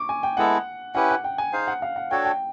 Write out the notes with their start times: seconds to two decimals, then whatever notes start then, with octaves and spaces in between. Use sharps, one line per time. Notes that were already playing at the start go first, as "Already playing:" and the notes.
Already playing: C#6 D6
0.09 G#5
0.23 G5
0.37 G#3 B3 E4 A4 F#5
0.95 C#4 E4 G4 B4 F#5
1.10 F#5
1.24 G5
1.38 G#5
1.53 D#4 G#4 C5 F5
1.67 F#5
1.82 F5
1.96 F#5
2.11 D4 F#4 A4 C#5 G5
2.25 G5